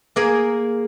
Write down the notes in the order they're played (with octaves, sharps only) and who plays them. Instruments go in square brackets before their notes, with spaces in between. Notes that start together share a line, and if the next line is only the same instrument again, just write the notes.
[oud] A#3 G#4 A#4